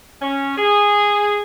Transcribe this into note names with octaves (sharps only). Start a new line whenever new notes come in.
C#4
G#4